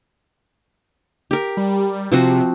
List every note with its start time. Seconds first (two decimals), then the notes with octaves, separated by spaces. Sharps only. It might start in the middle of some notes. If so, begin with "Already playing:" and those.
1.31 G4 A#4
1.57 G3
2.12 C3 F3 C4 F#4